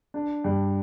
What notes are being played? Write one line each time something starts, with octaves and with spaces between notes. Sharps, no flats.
D4
G2